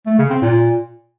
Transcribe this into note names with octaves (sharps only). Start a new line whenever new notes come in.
A3
C#3
C4
A#2